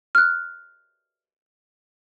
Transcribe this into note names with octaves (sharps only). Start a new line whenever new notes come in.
F6 F#6